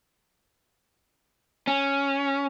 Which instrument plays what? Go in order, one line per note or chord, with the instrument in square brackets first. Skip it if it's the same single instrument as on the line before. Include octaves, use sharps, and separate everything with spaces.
[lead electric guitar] C#4